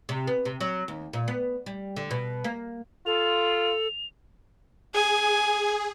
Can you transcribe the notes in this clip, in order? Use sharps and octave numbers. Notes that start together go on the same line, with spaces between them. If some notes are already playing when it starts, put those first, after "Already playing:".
C3
B3
C3
F#3
D#2
A#2
B3
G3
D3
B2
A#3
F4 A4 F7
G#4 G#5